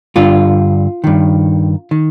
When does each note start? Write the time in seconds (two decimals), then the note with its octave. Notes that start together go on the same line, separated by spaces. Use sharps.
0.16 G2 D3 F4
1.04 G2 D#3
1.91 D#3